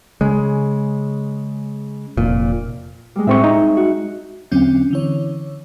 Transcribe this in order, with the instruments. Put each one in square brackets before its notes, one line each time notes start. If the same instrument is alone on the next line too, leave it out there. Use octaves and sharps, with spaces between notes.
[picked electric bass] C#3 G#3
F1 A#2
[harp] G3 G#3
[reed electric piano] A2 C4 C#6 [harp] E5
[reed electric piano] D#4
[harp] F#4
[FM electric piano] E2 D3 F#3 C4 C#4 G6
D3 E3 C#5